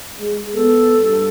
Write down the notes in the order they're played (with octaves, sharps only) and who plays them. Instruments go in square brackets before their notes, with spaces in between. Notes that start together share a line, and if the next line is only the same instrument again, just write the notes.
[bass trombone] G#3
[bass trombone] B3 [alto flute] A4
[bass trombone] G2